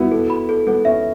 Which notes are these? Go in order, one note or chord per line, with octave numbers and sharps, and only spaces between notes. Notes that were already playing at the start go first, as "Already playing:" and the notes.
Already playing: B3 E4 F#4
A4
B5
A4
B3 A4
C#4 E5